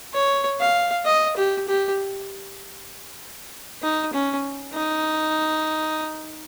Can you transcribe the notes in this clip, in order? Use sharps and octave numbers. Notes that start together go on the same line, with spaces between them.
C#5
F5
D#5
G4
G4
D#4
C#4
D#4